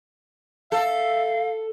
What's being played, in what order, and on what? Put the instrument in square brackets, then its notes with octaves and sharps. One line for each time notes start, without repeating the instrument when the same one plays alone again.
[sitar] A4 [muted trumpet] E5 [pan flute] F5